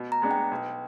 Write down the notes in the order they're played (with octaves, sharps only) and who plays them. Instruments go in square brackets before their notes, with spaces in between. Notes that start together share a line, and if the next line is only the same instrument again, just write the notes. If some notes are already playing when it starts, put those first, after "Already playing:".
Already playing: [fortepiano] B2
[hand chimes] A#5
[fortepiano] G#3 B3 D4
[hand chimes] G5
[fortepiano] B1